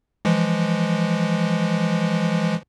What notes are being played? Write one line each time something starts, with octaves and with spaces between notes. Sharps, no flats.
E3 F3 G#3